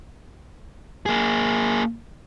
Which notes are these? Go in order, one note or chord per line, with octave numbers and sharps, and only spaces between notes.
A#3 G#4